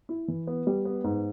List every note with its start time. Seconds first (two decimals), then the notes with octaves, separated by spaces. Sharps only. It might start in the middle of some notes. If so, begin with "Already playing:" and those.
0.09 E4
0.28 E3
0.47 B3
0.67 G3
0.85 B3
1.04 G#2